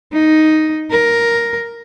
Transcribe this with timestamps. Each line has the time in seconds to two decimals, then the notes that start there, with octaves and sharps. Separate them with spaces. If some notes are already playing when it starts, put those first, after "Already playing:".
0.13 D#4
0.91 A#4